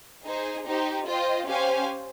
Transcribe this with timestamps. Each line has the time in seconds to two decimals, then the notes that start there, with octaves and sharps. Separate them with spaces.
0.23 D#4 G#4 C5
0.65 D#4 G4 C5
1.06 F4 C5 D#5 G5
1.47 C#4 G4 C5 F5 G#5